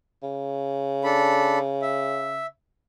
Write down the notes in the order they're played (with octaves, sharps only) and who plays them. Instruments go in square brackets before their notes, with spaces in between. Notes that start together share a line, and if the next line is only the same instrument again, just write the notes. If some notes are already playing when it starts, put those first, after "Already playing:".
[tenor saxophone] C#3
[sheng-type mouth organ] D4 A4 B5
E5